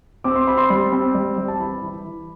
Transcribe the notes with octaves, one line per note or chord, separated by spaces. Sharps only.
C4 D6
C6
C4 B5
C6
G3
C4
G3
G3 G5
A5
E3 B5
E3
E3